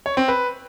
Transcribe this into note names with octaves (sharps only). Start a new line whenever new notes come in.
C#5
C4
B4